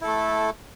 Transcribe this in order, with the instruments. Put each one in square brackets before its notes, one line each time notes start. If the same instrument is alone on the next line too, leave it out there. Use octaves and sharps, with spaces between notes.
[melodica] E4
A4
A3